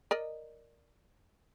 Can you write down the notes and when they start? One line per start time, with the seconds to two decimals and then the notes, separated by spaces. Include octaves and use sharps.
0.11 A#4 D5 D#5